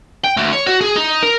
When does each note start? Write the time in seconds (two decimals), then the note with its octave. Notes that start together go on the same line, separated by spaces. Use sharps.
0.24 G5
0.37 D2
0.52 C#5
0.67 F#4
0.81 G#4
0.96 D#4
1.23 A#4